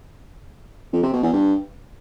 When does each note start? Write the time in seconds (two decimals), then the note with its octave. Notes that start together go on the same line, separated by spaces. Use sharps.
0.93 F2
1.03 C3
1.13 B2
1.23 E2
1.33 G2